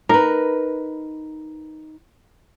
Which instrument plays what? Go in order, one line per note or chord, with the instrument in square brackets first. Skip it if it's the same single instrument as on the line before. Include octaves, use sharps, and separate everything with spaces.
[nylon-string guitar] D#4 B4 [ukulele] A#4